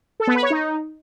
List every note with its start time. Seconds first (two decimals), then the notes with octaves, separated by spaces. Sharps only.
0.20 A4
0.27 B3
0.35 B4
0.43 C#5
0.50 D#4